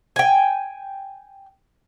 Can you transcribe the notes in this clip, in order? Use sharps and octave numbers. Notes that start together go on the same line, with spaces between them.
G5 G#5